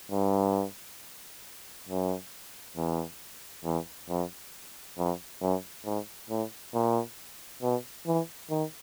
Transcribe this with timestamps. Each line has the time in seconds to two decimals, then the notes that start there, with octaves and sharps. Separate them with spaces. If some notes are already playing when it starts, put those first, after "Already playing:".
0.12 G2
1.89 F#2
2.77 E2
3.64 E2
4.10 F2
4.98 F2
5.41 F#2
5.85 G#2
6.30 A2
6.74 A#2
7.62 B2
8.07 E3
8.50 D#3